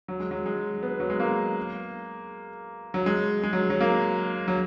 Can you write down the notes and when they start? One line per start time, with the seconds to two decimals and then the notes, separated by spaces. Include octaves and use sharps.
0.08 F#3
0.20 G#3
0.31 F#3
0.46 G#3
0.83 B3
1.00 F#3
1.10 G#3
1.20 A#3
2.94 F#3
3.06 G#3
3.43 G#3
3.53 F#3
3.70 F#3
3.81 A#3
4.48 F#3